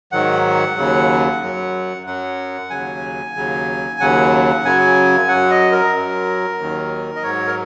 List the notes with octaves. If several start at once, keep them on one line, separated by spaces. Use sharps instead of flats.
G#2 D#3 F#3 F#5
D#2 C#3 F#3
F#2 F#3
F#2 F#3 F#5
D#2 C#3 F#3 G#5
D#2 C#3 F#3
D#2 C#3 F#3 F#5
F#2 C#3 F#3 G#5
F#2 F#3 F#5
D#5
A#4
F#2 F#3
D#2 D#3 F#3
D#5
G#2 F#3 C#5
A#4